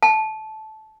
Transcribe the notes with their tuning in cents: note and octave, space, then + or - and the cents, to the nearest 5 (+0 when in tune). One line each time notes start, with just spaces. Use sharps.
A5 -15